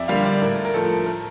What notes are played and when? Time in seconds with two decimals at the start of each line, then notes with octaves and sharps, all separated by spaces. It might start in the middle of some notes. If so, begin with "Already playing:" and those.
Already playing: F2 D5 E5
0.08 D3 G3 A#3 F5
0.25 D5
0.42 A2 A#4
0.65 A#4
0.74 F3 A3 A4
1.06 A#4